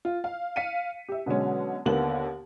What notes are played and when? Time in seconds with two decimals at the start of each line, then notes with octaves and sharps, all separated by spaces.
0.05 F4
0.24 F5
0.56 F5 B6 C#7 D#7
1.09 G4 E5
1.26 B2 D3 F#3 G#3 C#4
1.86 D#2 D3 A#3 B3 F#7